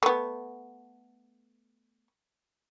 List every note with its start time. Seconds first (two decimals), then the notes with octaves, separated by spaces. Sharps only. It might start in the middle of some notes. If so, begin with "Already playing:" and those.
0.03 A3 B3